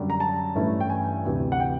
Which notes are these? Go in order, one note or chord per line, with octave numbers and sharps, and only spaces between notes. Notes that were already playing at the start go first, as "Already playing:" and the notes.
Already playing: F#2 D3 G3
A#5
A5
G2 E3 A3 C#4 E4
G5
G#5
D2 C3 E3
F#5
G5